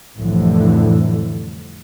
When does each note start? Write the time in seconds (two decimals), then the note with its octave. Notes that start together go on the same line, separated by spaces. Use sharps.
0.17 C2 F2 A2 D3 E3